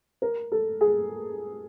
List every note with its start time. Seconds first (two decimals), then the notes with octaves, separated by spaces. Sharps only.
0.22 A#4
0.52 A4
0.81 G#4